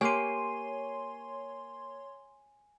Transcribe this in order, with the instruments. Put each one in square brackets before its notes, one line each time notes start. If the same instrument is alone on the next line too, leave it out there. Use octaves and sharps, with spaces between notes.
[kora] A#3 G4 [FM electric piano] C#5 C6 [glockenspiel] G#5 D#7